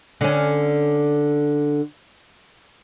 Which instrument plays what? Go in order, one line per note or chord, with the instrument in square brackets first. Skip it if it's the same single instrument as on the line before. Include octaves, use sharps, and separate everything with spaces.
[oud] D3 C#4